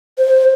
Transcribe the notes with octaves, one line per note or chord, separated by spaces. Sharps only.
C5